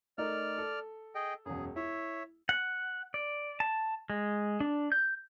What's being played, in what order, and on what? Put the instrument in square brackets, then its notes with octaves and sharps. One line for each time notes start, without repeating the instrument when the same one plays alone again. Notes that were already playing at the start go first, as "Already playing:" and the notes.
[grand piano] A3 D#4 A#4 [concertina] D5 F6
[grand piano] A4
[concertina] G#4 D#5 G5
[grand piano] E1 F#2 [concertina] G#4
[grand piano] E4 [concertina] C#5 E5
[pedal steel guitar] F#5
D5
A5
G#3
D4
G6